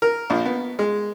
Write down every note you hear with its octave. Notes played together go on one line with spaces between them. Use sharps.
A#4
A#1
B3
G#3